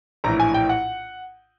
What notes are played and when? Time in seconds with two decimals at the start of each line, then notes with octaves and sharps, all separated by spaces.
0.24 A#1 A2 E3 A#5
0.40 G#5
0.54 G5
0.69 F#5